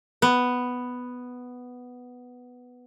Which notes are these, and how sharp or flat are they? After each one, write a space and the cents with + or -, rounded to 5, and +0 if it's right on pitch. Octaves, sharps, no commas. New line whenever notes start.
B3 +5